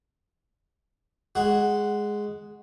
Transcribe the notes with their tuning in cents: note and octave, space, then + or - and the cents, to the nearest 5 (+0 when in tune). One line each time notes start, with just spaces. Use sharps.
G#3 +0 F#4 +0